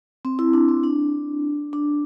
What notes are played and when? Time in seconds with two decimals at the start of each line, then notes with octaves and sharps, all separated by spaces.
0.25 C4
0.39 E4
0.53 D4
0.68 C4
0.83 D4
1.73 D4